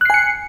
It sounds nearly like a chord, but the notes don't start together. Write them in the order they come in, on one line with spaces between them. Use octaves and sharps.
F#6 C7 G#5 C#7